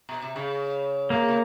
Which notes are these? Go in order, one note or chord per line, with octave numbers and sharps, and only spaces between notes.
B2
C3
C#3
B2 A#3
C#3